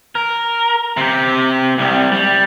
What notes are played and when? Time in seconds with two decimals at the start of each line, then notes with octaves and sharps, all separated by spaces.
0.15 A#4
0.97 C3 G4
1.78 C2 G3
2.12 G3